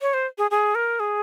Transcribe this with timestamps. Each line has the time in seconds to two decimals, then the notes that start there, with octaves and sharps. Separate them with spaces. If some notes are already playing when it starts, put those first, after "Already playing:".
0.02 C#5
0.14 C5
0.38 G#4
0.51 G#4
0.75 A#4
1.00 G#4